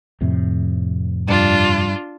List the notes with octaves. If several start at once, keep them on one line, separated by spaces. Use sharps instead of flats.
F2 A2 C3
G2 D4 F4